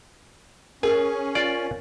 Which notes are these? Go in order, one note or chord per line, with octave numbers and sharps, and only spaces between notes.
C#4 G#4 A#4
F4 D5